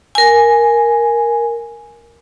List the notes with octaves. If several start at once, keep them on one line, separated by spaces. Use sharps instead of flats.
A#4 G#5